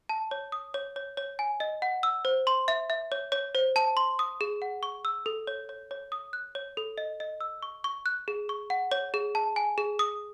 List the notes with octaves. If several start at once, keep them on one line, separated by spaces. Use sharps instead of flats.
A5
C#5
D#6
C#5
C#5
C#5
G#5
D#5
F#5
E6
C5
C6
E5
E5
C#5
C#5
C5
A5
C6
D#6
G#4
F#5
C#6
E6
A4
C#5
C#5
C#5
D#6
F#6
C#5
A4
D#5
D#5
E6
C#6
C#6
F#6
G#4
C#6
F#5
C#5
G#4
A5
G#5
G#4
D#6